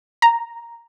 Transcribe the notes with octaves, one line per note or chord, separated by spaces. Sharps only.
A#5